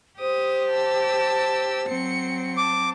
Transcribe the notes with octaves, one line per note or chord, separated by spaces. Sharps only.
G4 C5 D#6
A5 E6
F#3 C4 C#7
A5 D6